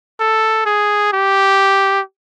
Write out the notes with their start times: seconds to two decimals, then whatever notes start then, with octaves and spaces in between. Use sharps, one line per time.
0.20 A4
0.66 G#4
1.13 G4